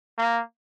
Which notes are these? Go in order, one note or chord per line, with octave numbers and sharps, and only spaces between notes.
A#3